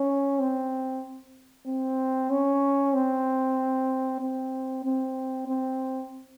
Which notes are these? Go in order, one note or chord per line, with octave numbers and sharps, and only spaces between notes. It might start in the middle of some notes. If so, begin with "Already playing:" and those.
Already playing: C#4
C4
C4
C#4
C4
C4
C4
C4